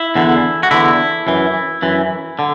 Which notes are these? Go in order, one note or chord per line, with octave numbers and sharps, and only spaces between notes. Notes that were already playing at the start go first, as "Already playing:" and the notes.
Already playing: E4
E2 D3
F#4
E2 D3 E4
F#2 E3
F#2 E3
D3